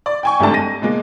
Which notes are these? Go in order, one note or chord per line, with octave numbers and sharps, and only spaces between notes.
D5
G5 G#5 C#6
G#1 G#2 G3 A3 D4 A5
A#6 D#7
B2 G#3 A#3